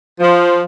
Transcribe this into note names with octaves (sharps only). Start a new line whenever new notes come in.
F3